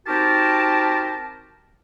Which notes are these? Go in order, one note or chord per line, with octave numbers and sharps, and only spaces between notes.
C4 D#4 F#4 G4 A#4 A5